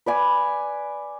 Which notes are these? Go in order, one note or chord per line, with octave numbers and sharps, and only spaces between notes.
B4 D5 G#5